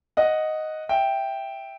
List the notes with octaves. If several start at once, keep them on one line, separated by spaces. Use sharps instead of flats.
D#5 F#5
E5 G5